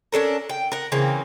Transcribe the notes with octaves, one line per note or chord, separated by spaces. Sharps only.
C#4 D4 A4 A#4
G5
A#4 F#5
C#3 E3 A#3 C4